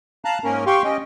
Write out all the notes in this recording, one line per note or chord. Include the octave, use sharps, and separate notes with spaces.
F5 A5 A#5 F#6
G#2 A#3 C#4 A#4
G4 F5 G5 C6 C#6
C#4 D#5 G5